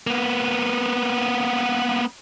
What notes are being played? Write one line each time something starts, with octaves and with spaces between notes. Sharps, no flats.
A#3 B3